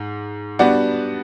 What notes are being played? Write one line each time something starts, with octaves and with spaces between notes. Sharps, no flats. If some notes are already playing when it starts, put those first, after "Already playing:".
Already playing: G#2
G3 B3 D4 F#4